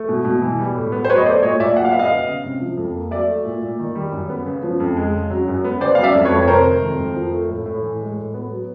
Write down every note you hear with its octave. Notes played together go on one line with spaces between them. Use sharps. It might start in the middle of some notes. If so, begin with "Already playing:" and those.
Already playing: A3
B2
B2
E3
G3
A2
B3
C5
F#3 B4 C#5
D#5
A3 C5 D5
A#2 C#5 D#5
A#2 D5 E5
F#3 F#5
F5
B3 E5
D#5 F5
C#3
C#3
C3
F3
F2
A#3
F#3 D5 E5
A3
A#2
A#2
D#3
G3
F#2
B3
C#3
F3
F2
G#3
C#3
F#3
F#2
B3
C#3 C5 D5
F#3 F5
D5 E5
F2
B4 C#5
F2
C#5
C3 A#4 C5
D#3
F2
F2
F3
A3
A2
A2
E3
G#3
A2
B3
F#3